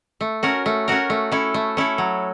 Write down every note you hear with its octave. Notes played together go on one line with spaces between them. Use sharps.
A3
C#4 F#4 A#4
A3
C#4 F#4 A#4
A3
C#4 E4 A4
A3
C#4 E4 A4
F#3